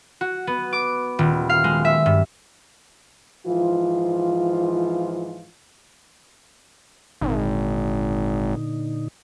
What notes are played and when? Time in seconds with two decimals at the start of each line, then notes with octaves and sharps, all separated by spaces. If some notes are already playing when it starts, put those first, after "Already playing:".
0.21 F#4
0.47 B3
0.73 D6
1.19 D#1
1.49 F5
1.64 G#3
1.85 E5
2.06 G2
3.47 G#2 E3 F3 F4
7.21 G#1 A#2 D3 D#4